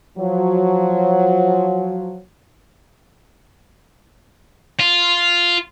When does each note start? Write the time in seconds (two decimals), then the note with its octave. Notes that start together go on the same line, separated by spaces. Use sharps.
0.18 F3 F#3
4.80 F4